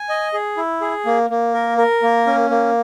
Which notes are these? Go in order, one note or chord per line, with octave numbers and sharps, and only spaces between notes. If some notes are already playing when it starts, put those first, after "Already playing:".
Already playing: G#5
D#5
G#4
E4
G#4
A#3
A#3
A#4
A#4
A#3
C#4
A#3